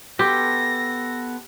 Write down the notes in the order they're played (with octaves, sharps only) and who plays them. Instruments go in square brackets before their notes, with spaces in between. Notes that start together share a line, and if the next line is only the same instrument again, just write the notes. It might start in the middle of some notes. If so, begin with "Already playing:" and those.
[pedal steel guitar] B3 A4 C6 [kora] G4 [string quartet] A#6